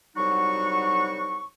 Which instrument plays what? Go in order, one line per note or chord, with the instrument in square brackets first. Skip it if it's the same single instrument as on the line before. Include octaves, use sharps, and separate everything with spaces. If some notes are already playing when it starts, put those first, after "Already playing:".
[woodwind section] C2 F#3 G3 D#4 F#4 C#6